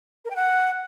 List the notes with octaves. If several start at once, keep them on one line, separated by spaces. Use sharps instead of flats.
A#4
G5
F#5